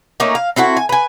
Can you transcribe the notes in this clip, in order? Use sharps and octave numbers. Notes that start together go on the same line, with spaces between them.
A3 A#3 C#4 D#4
F5
C4 E4 F#4 A4
G#5
B4 G#5